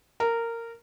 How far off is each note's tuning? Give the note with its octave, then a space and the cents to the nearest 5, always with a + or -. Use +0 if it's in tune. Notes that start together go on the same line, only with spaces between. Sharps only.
A#4 -15